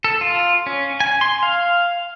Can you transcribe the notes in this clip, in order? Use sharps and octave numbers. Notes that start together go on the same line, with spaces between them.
A4
F4
C#4
G#5
C6
F5